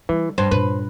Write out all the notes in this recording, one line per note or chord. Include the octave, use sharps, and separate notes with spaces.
E3 G3
G2 D4 C5
G2 A#2 B4